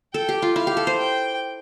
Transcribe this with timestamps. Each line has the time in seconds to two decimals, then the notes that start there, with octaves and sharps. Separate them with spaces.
0.14 A4 G5
0.29 G4
0.42 F4
0.56 E4 F5
0.67 G4
0.77 A4
0.87 C5
0.98 G5